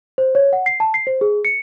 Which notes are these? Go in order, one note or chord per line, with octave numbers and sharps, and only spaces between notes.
C5
C#5
F#5
C7
A5
C7
C5
G#4
C#7